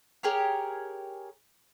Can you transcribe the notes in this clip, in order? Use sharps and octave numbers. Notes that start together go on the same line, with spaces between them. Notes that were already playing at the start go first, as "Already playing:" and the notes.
G4 G#4 A#4 C#5